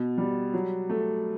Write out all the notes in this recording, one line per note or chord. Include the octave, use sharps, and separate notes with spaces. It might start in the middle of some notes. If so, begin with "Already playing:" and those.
Already playing: B2
G3
F#3
A3